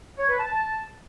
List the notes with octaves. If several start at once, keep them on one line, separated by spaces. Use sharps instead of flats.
C#5
B4
A5